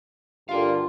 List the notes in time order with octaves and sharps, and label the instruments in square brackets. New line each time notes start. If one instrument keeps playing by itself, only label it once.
[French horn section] G2 D3 [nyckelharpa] F4 [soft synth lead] G4 [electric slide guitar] A#4 F5